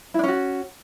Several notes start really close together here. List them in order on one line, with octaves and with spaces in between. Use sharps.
E4 D4 C#4 F#4